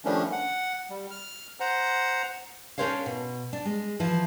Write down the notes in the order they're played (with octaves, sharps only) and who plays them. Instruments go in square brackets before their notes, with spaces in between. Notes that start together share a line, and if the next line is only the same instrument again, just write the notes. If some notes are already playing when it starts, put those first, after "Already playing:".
[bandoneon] D#3 F3 G3 A3 C#4 D4
F#5
G3
F6
C5 F#5 A#5
[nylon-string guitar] C#4 D4 A#4 C5 C#5 F5
B2
D4
G#3
E3 F3 E4